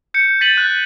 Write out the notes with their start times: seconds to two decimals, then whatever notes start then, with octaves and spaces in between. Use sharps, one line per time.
0.14 G6 C#7
0.41 A6 B6 D#7 F#7
0.57 F#6